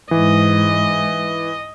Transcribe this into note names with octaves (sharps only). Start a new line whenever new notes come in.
G#2 E3 D#5